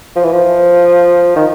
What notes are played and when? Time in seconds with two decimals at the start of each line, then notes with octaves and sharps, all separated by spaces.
0.16 F3
0.24 E3
0.32 F3
1.36 D#3